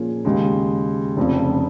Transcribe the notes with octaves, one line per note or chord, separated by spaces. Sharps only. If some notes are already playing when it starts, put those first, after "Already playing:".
Already playing: A#2 F3 A#3 C#4 G#4
D#2 C#3 G#3
F1 F2 C#3